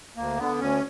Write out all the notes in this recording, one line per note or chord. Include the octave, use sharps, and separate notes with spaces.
D2 A#3
D3 B3
D2 C#4